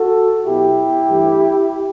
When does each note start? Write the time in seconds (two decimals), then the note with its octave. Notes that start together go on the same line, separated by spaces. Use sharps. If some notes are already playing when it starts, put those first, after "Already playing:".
Already playing: F#4 A4
0.45 B2 F#3 B3 E4 G4
1.08 G2 E3 A3